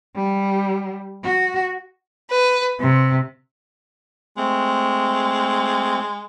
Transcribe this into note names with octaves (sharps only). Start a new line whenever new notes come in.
G3
F#4
B4
C3
G#3 A3 C4